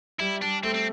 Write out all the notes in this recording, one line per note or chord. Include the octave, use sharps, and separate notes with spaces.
G3 E4
G3 D4
A3 C4
C4